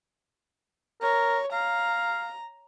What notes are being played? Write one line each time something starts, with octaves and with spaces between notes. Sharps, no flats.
A#4 C#5
F5 A#5